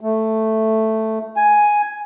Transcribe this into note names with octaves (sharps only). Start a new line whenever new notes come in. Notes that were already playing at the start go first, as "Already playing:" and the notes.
A3
G#5